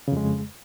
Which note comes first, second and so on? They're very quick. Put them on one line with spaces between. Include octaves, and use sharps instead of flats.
C#3 F2 G#3